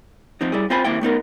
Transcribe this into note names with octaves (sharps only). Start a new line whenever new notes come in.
F3 C4 D#4
G3 E4 G#4
C4 F4 C5 F5 G#5 B5
D#2 A#3 C4 E4 E5 G5
A3 B3 D#4 A#4